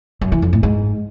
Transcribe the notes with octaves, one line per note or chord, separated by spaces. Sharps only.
F#2
E3
F2
A2
G#2